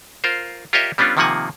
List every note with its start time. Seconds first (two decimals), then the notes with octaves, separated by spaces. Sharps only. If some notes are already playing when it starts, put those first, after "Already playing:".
0.24 F4 A#4 C5
0.73 F4 G4 A#4 C#5 D#5 E5
0.98 G3 B3 C#4 D4 F4
1.17 C3 D#3 F3 A#3 F#5 G#5